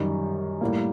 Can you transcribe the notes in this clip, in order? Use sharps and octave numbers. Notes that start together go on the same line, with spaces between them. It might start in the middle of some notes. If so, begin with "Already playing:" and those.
Already playing: F#2 D#3 G3
A2 G3 A#3